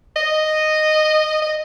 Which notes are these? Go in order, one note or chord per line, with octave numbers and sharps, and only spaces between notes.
D#5
D#5